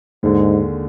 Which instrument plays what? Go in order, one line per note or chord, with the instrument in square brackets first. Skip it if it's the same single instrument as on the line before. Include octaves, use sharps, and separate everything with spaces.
[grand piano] D#2 D3 G#3 [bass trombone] G#2